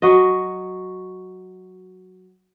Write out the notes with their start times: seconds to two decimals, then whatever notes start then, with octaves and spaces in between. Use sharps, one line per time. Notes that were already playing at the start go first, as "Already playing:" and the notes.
0.02 F#3 F#4 D#5